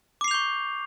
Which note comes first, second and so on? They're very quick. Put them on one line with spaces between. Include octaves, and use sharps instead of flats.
D6 C7 F7 G6 C#6